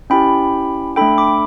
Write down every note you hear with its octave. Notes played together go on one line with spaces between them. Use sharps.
C#4 E4 G4 G5 B5
A3 D4 A4 G5 B5
B5 D6